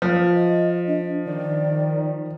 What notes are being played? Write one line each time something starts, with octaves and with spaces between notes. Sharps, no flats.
F3
D#5
D4
D#3 D5